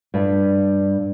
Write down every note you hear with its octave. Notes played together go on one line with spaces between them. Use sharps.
G2